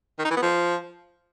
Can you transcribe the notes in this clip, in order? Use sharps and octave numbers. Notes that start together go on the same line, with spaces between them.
D#3
D#4
E3
B3
F3